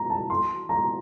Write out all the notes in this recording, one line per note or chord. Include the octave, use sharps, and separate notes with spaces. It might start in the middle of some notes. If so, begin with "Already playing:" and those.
Already playing: A#5
A5
C6
A#5